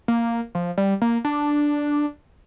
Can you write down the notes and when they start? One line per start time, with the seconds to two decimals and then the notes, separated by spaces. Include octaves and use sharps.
0.08 A#3
0.55 F3
0.78 G3
1.02 A#3
1.25 D4